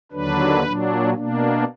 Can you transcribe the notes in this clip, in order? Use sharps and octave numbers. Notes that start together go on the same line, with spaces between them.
D#2 D3 F#3 D4 B4
A#2 F#3 D4
B2 A#3 D4